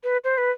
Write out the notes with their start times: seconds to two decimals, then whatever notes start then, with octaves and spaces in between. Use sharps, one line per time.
0.04 B4
0.24 C5
0.38 B4